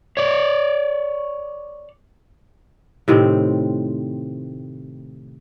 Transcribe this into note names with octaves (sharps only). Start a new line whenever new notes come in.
C#5 D5
A2 C3 D#3 C4